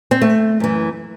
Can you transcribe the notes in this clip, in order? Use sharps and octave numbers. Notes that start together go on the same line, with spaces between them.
C4
A3
F#2 E3